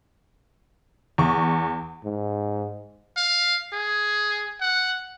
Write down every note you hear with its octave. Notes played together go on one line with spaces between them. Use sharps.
E2 C#6
G#2
F5
G#4
F#5